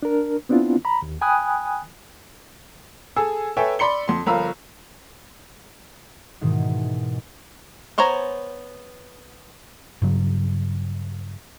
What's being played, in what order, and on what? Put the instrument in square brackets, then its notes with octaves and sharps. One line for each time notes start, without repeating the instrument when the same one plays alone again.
[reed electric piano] D4 A#4
B3 C4 D4 E4 F4
A#5 B5
D#2
G5 G#5 B5 D#6 F#6
[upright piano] G#4 A4 G#5 E6
A4 B4 C#5 E5 G5 G#5
D5 B5 C6 C#7 G7
F2 C6
G1 F3 A#4 F5 B5 E6
[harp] G#2 B2 D#3 E3 G#3
[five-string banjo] B3 C5 C#5 G#5 A#5
[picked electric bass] G2 C#3 F#3